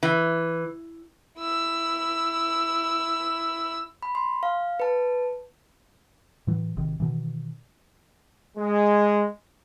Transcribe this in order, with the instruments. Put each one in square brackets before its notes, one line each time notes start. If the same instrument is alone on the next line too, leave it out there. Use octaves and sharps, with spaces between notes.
[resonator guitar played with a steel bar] E3
[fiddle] E4 E6
[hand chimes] B5
C6
F5
B4 A5
[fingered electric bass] A2 E3 F#3
G#1 C3 D#3
B2 D#3 E3
[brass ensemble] G#3